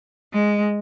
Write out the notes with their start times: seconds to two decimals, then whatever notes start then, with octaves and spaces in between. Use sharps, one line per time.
0.33 G#3